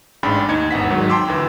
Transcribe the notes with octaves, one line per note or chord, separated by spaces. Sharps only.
A1 G#2 D4 G5 B5 A6
D#2 D#4 G#6 C#7
G#1 E2 F#5 B6
G#2 D#3 F#3
G5 A5 C6 D6 E6
D2 E3